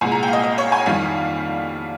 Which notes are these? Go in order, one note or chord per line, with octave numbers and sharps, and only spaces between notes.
C2 A#2 G#3 G#5
A#5
G5
F5
D#5
D#5
C#5
G#5
F2 D#3 G3 F5